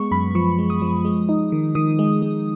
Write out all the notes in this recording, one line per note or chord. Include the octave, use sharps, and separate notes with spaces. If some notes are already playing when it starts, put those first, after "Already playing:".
Already playing: G#3 B3 C#6
F#2 B5
F3 C#6
G#3
D#6
F3
G#3
D#4
D#3
D#3 D#6
G#3
G#3